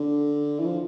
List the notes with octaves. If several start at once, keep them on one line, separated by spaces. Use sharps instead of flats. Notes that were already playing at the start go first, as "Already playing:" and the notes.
Already playing: D3
E3
F3